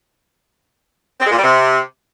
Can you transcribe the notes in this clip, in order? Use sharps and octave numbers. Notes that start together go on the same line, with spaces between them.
C4
G#3
A#2
G3
C3